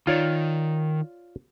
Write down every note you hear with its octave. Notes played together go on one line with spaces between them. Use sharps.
D#3 F4 C#5 D5